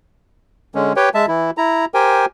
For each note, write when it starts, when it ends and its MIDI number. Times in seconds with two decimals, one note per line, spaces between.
0.75 0.93 50
0.75 0.93 56
0.75 0.93 61
0.96 1.09 67
0.96 1.09 71
0.96 1.09 73
0.96 1.09 79
1.14 1.26 56
1.14 1.26 76
1.14 1.26 81
1.28 1.51 52
1.28 1.51 64
1.58 1.85 64
1.58 1.85 82
1.94 2.26 67
1.94 2.26 70
1.94 2.26 72
1.94 2.26 79
1.94 2.26 80